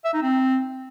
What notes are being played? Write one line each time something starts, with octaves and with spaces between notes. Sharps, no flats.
E5
D#4
C4